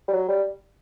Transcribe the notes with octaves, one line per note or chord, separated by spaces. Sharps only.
G3
F#3
G3